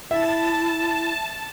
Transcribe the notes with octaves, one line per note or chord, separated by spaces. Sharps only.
E4 E5 A5